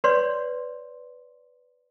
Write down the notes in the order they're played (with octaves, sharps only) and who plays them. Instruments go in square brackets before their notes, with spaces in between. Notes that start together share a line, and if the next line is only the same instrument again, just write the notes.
[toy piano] B4 C#5 D5 C6